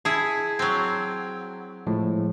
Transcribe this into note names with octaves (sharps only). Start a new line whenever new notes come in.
E4 G#4 A5
F#3 C4
A2 F3 G#3